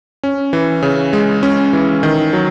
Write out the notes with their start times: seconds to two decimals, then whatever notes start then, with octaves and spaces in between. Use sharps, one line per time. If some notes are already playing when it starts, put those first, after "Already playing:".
0.23 C#4
0.53 E3
0.83 C#3
1.13 G#3
1.43 C#4
1.73 E3
2.03 D#3
2.33 F#3